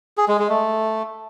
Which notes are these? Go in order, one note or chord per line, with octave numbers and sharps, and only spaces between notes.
G#4
G#3
G#3
A3